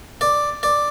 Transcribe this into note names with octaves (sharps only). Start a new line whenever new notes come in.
D5
D5